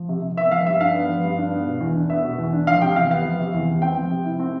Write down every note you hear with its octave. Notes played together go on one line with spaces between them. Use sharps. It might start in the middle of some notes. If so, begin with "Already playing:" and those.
Already playing: F3
C3
C3
B3 E5
F3 F5
G2 E5
D4 F5
B3
F3
G2
D4
B3
B2
E2
D4
B3 E5
B2
E2
D4
F3 F5
C3 G5
E2 F5
B3 F5
F3
C3
E2
B3
C4 G5
F3
C3
E4
C4